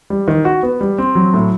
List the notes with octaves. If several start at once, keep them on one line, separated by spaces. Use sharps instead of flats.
G3
D#3
F#4
B3
G3
C4
F#3
A2